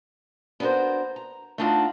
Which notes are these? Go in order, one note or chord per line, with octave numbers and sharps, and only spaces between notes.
B3 D4 F#4 A#4 C5
A#5
A3 B3 D4 D#4 F4 F#4